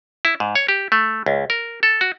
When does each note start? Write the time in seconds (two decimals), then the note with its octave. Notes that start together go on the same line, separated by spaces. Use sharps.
0.25 E4
0.40 G#2
0.55 C#5
0.68 G4
0.92 A3
1.26 C#2
1.50 A#4
1.83 A4
2.01 F#4